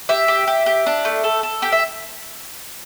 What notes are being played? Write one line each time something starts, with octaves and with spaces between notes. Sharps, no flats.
G4 E5
G4
G4
G4
D4
A3
A4
A4
G4 G5
E5